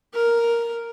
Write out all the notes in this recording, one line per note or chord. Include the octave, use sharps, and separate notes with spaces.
A#4